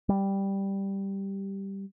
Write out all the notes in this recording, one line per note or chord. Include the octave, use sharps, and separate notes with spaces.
G3